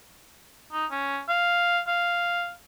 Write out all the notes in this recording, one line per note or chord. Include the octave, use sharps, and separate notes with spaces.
D#4
C#4
F5
F5